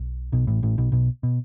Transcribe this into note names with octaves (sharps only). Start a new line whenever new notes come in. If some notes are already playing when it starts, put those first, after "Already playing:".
Already playing: B1 B2
B1 B2
A1 A2
A1 A2
B1 B2
B1 B2
B2